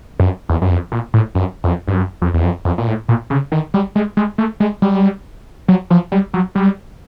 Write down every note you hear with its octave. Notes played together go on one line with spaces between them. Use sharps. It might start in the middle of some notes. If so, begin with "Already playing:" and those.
F#2
E2
F#2
F2
A#2
A2
F#2
F2
G2
F#2
F2
E2
F2
F2
A#2
A2
A#2
C#3
D#3
G3
G#3
G#3
A3
G#3
G3
F#3
F3
G3
F#3
G3